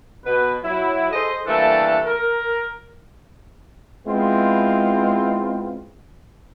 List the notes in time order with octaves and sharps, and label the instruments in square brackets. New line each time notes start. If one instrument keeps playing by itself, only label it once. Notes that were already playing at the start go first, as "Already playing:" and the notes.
[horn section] B2 B4
F#3 E4
G#4 A4 C5 D#5
E3 G3 A3 A#3 D4 A4
A#4
[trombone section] G#3 B3 C4 E4 F4